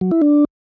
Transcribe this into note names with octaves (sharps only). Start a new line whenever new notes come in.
F#3
E4
D4